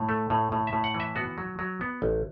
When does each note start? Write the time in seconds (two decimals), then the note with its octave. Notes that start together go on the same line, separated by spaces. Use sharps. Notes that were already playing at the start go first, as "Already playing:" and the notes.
Already playing: A2
0.09 A3
0.30 A2
0.52 A2
0.67 E5
0.73 A2
0.84 F#5
0.94 E3
1.00 E5
1.16 B3 F#4
1.38 F#3
1.59 F#3
1.81 B3
2.02 A1